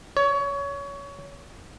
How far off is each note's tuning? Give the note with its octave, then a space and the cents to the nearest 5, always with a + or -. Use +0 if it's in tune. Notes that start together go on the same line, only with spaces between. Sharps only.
C#5 +25